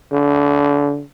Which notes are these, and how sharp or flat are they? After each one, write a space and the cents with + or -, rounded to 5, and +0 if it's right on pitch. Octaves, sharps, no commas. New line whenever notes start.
D3 -30